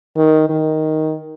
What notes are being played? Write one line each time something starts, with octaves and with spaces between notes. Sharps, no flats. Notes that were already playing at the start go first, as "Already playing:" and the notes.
D#3
D#3